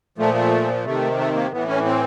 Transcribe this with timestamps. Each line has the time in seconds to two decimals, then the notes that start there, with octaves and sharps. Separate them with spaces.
0.18 A#2 F3 A3
0.35 A3
0.85 C3 D#3 A3
1.18 A3
1.35 A#3
1.52 A2 E3 B3
1.68 C#4
1.85 C4